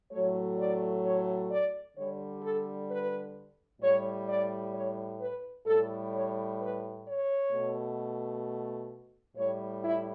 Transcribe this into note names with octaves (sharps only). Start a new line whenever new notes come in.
A2 F#3 A3 C#5
D5
C#5
D5
D3 G3 C#5
A4
B4
A2 G3 C#5
D5
C#5
B4
A2 G3 A4
C#5
B4
C#5
B2 A3
A2 G3 C#5
E4